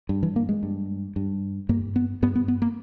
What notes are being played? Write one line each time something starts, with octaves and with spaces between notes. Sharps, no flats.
G2
E3
A#3
G#3
G2
G2
G2 A#3
B3
G2 B3
B3
B3
A#3